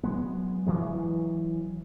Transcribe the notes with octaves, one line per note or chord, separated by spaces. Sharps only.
F#3 G#3 B3
E3 F#3 G#3